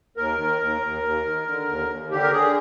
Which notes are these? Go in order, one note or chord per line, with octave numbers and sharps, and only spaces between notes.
D#2 A#4
D#3
D#2
D#2
D#2
D#3
D3
D#2
D#2
D3 G4
A#4
D3 G#4